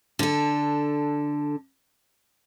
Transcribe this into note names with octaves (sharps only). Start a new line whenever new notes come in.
D3 A4